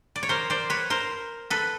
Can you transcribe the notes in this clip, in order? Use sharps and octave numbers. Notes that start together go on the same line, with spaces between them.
D5
C#5
A#4 C5
C5 D5
B4 C#5
A#4 C5
A4 B4